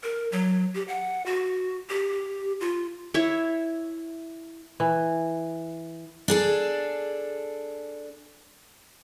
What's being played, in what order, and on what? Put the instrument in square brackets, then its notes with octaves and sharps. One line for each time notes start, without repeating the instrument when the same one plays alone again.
[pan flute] A#4
F#3
G4
F#5
F#4
G4
F4
[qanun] E4 C#5 E5
[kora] E3
[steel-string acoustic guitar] D4 G#4 A4